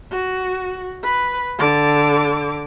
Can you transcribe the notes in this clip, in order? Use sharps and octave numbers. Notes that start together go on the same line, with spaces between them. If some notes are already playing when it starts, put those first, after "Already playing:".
F#4
B4
D3 D6